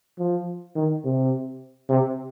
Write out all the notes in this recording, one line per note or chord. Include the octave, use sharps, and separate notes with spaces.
F3
D#3
C3
C3